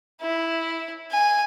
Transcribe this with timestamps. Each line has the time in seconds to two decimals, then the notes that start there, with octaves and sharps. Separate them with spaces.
0.22 E4
1.12 G#5